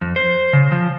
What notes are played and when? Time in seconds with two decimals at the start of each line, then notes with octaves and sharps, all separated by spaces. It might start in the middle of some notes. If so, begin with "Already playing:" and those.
0.01 F2
0.16 C5
0.53 C#3
0.72 F3